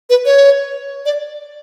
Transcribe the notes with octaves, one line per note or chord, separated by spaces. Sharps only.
B4
C#5
D5